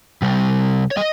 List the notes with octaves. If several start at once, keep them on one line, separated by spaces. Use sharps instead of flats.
C3 G3
C#5
G3 D#5